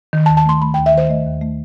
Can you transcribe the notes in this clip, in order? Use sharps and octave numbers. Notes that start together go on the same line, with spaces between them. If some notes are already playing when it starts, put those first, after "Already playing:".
D#3
A5
D#2
A5
A3 C6
A3 B5
D#2 G5
E5
D#3 C5
A3 D#5
D#2
A3